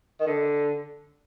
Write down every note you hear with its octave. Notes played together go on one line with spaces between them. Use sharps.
D#3
D3